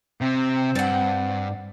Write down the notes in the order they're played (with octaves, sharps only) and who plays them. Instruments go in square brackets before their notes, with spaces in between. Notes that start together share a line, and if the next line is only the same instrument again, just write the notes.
[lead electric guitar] C3 [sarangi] C4
[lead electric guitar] G2 [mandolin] D5 F#5